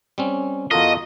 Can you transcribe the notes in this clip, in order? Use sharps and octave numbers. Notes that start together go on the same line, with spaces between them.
G3 C4 C#4
E2 F4 F#4 A4 A#4 D#5